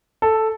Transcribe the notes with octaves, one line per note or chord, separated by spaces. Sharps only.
A4